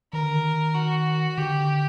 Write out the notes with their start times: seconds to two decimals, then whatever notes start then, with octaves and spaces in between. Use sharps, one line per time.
0.12 D#3 A#4
0.23 D3
0.33 D#3
0.75 F#4
1.38 D3 G4